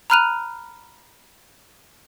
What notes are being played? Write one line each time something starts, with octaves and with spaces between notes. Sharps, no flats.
A#5 B5 F6 F#6 D#7 F7